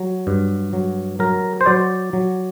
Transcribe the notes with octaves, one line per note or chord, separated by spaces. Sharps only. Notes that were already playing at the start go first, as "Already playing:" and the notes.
Already playing: F#3
G2
F#3
F#3 A#4
C5
F#3 D5
F#3